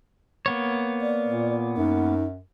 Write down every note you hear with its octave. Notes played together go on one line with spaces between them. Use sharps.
A#3 B3 C#5
D5
A#2
F#2 D#4